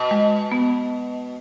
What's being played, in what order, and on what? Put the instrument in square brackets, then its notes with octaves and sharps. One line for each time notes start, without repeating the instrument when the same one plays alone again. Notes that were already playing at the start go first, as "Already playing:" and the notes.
Already playing: [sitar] B2
[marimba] G#3
B3